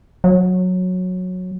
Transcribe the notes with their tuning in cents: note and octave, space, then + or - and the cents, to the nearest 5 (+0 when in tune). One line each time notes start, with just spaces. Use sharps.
F#3 -15